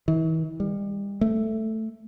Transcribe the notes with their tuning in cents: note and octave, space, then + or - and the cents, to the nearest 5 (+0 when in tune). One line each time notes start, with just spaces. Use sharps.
E3 -40
G3 +35
A3 +5